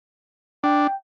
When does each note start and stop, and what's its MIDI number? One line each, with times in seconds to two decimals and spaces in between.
0.64 0.87 62
0.64 0.95 79